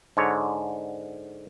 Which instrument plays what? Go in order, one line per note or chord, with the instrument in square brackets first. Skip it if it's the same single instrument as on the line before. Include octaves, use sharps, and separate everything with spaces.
[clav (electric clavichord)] G#2 D3 C#5